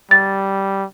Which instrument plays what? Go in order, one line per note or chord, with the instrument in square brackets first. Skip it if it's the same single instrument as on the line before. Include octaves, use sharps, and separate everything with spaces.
[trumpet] G3 [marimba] A6